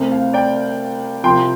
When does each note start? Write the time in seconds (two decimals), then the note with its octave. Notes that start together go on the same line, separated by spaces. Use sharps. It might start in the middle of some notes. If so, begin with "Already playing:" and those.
Already playing: C2 C3 A3 C4
0.12 F5
0.34 D5 G5
1.24 C2 C3 F3 G5 C6